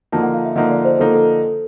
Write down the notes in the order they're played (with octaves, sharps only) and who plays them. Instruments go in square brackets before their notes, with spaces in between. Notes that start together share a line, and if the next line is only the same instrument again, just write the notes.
[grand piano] D3 F3 A#3 D#4 [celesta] A5
[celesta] F#5
F5
E5
[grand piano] D3 F3 A#3 D#4 [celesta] D#5
[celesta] D5
C5
[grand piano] D3 F3 A#3 D#4 [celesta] A4
[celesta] A4